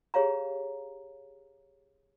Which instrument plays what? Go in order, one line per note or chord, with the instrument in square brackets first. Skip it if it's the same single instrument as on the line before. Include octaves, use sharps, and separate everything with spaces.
[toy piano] G4 G#4 C#5 F5 A#5